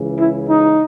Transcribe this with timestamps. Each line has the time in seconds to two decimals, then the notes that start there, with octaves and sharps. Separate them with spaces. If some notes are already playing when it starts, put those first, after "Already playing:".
Already playing: C#2 C#3 E3
0.18 E4
0.48 D#4